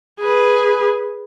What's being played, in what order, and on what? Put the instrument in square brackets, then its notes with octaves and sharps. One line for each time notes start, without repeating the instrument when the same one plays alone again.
[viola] G#4 B4